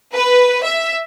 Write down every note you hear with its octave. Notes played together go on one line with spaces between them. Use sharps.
B4
E5